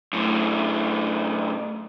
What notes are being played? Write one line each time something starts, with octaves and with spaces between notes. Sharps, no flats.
F#2 A2